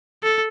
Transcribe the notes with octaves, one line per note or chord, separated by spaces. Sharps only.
A4